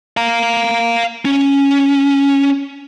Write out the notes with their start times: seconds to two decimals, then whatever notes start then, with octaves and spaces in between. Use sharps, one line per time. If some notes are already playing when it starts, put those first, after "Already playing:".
0.17 F5 A#5
1.25 C#4